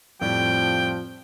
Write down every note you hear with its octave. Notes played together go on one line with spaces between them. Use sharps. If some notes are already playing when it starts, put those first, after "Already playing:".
F2 A2 F3 G3 G5